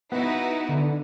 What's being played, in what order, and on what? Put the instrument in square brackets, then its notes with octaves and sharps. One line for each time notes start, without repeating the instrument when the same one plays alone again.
[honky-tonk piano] B3 [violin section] D#4 E4 F#4
[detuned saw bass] D3